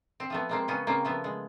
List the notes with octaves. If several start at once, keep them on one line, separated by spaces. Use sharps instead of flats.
C4
F3 A3 B3
G#3 A#3 C4
C#3 B3 C#4
C#3 A#3 C4
F3 A3 B3
G#3